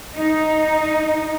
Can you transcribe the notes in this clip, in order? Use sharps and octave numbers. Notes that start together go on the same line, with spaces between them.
D#4